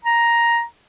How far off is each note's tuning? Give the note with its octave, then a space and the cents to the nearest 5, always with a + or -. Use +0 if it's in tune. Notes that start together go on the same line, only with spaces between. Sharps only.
A#5 +5